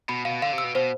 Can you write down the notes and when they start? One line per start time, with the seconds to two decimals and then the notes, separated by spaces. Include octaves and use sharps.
0.09 B2 B5
0.25 B2 F5
0.42 D3 F5
0.53 C3
0.58 E6
0.64 B2
0.75 B2 C5